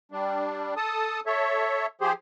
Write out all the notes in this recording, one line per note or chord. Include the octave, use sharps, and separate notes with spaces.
G3 D4
A4 A5 D#6
A4 C#5 E5
F3 G4 G#4 C5